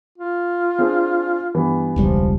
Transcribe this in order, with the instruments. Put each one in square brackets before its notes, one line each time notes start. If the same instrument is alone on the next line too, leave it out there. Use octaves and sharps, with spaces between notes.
[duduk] F4
[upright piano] C4 D4 G#4
G2 E3 B3
[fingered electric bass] E1 C#2 G3 [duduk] F3